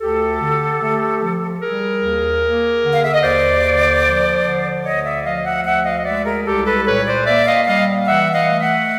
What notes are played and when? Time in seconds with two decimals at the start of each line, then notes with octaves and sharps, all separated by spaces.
0.01 D2 G4 A4
0.41 D3
0.82 A3
1.22 F3
1.62 G3 G#4 A#4
2.02 D#2
2.43 A#3
2.83 D3
2.94 F5
3.05 E5
3.14 D#5
3.23 D#2 C5 D5
3.64 D3
4.05 F3
4.44 D3
4.85 D2 C#5 D#5
5.05 D5 E5
5.25 F3 D#5 F5
5.45 E5 F#5
5.65 D2 E5 F#5
5.85 D#5 F5
5.98 D#5
6.05 G#3 D5 E5
6.25 G#4 A#4
6.46 C2 G4 A4
6.66 A4 B4
6.86 A#2 B4 C#5
7.06 C5 D5
7.26 A#3 D5 E5
7.47 D#5 F5
7.66 G3 D#5 F5
8.07 E3 E5 F#5
8.33 D#5 F5
8.47 A3
8.61 E5 F#5